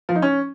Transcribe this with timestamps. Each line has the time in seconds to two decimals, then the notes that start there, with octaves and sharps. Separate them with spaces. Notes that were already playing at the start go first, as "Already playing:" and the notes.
0.09 F3
0.16 D#4
0.22 C#4